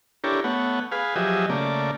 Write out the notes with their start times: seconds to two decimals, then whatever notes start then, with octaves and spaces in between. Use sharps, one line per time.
0.24 D4 E4 G4 A4 A#4 C#5
0.44 A3 B3 C#5 F#5
0.92 G#4 B4 F5
1.16 F3 F#3 G4 G#4 D#5 E5
1.50 C#3 A3 A#3 D5